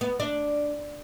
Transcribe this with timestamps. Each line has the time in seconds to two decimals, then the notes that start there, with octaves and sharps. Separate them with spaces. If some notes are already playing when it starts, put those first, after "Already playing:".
0.01 B3
0.20 D4